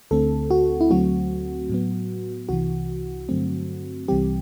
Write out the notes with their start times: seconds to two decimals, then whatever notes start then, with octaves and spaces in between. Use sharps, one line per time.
0.11 D2 D3 A3 C4 A4
0.51 F#4
0.81 E4
0.90 D2 D3 F#3 A3 C4 F#4
1.69 A2 F#3 B3
2.49 C2 C3 E3 F#4
3.29 G2 D3 F#3 A3 C4
4.08 C2 C3 E3 G3 C4 G4